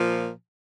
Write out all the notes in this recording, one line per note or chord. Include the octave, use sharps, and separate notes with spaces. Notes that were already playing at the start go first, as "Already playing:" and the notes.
Already playing: A#2 F3